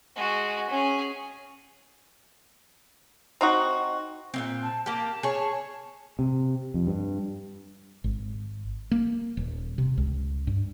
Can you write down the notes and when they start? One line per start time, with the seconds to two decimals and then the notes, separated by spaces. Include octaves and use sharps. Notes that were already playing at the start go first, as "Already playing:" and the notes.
0.16 G#3 F#4
0.70 C#4 G#4
3.41 C4 D#4 F#4
4.34 A#2 A#3 C4
4.63 A5
4.86 A#3 G4 A5
5.23 G#4 C#5
6.19 C3
6.74 F2
6.87 G2
8.04 G#1
8.91 A#3
9.37 D#1
9.78 C3
9.98 C#2
10.47 G2